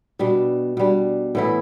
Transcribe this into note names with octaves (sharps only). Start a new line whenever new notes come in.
B2 G3 D4
B2 G3 D4
A2 E3 B3 E4